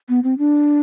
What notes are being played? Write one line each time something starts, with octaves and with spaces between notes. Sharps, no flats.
B3
C4
D4